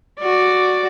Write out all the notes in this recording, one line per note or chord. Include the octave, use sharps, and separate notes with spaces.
F#4 D5